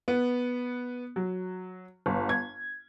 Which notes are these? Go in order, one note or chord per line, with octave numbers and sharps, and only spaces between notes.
B3
F#3
G1
G#6